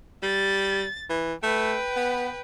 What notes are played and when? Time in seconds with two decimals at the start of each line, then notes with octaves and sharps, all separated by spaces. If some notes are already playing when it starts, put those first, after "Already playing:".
0.23 G3 A6
1.10 E3
1.43 A3 B4 G5
1.96 B3